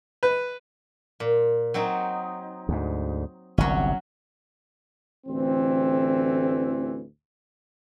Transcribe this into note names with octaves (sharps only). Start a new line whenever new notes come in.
B4
A#2
F#3 C4 D#4
D2 G#2
G1 C2 G2 F#3 C#4
A1 D2 E3 C4